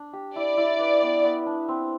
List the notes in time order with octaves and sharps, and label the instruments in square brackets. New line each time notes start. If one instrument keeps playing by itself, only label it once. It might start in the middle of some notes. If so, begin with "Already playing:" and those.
Already playing: [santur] D4
G4
[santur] E4 [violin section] D5
[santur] E4
B4
B3
B3
D4
C4